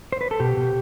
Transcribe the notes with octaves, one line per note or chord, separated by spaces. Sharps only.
C5
B4
A4
B2 G4
B2